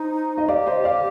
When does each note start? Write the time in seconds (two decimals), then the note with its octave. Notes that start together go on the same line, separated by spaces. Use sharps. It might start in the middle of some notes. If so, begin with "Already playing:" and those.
Already playing: D#4 C5
0.38 D#5
0.48 G4 D5 F5
0.66 C5 D#5
0.84 D5 F5